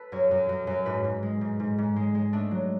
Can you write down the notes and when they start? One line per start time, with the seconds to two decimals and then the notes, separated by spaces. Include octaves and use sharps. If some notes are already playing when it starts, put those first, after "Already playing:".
Already playing: A4 B4
0.12 F#2 C#5
0.31 F#2
0.49 F#2
0.67 F#2
0.86 G#2 B4
1.04 G#2
1.23 G#3
1.41 G#2
1.60 G#2
1.78 G#2
1.96 G#3
2.15 G#3
2.33 A3 D4
2.51 F#3